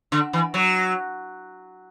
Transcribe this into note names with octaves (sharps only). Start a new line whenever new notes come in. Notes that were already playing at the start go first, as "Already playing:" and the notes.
D3
E3
F#3